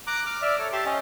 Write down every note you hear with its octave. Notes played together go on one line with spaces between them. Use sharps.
A#5 D6 F#6
D6 F6
D5 E5 F6
A4 C#5
G4 E5 A5 C6
C#4 D#5